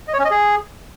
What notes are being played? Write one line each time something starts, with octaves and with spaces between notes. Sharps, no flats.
D#5
C#5
C#4
D#5
G#4